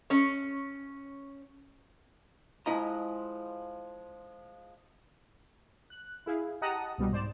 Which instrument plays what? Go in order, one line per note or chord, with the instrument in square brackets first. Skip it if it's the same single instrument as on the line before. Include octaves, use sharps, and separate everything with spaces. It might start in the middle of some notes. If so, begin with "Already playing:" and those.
[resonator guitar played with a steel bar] C#4 C#5
[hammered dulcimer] F3 G#3 [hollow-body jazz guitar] E4 D#5 A#5
[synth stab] F#6
E4 G#4 F5
G4 D#5 F#5 A5 A#5 D#6
C2 B2 G3
G#2 C5 D5 E7